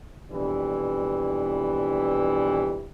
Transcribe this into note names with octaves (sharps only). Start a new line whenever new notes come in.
F2 B2 E3 G3 D4 E4